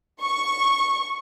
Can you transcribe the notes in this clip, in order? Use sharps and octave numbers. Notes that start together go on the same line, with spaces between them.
C#6